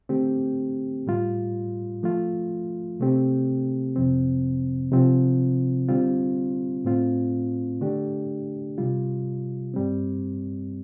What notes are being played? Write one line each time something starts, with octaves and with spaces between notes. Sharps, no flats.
D3 A3 C4 G4
A2 G3 F4
F3 A3 F4
C3 A3 C4 G4
F2 C3 F3 C4
C3 F3 C4 F4
D3 G3 C4 F4
A2 A3 C4 F4
D3 A3 D4 G4
C3 G3 F4
G2 G3 C4